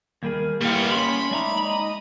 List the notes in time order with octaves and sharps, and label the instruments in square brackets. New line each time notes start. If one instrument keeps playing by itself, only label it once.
[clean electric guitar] D#2 G3 G#4 [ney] A#4
[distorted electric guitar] G3 B3 [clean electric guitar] A#3 F5 [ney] E4
[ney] C#4 [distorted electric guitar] B5 [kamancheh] C6
[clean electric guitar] G#3 G#5 A#5 [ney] D#4 [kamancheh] D5 E5
[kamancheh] D#5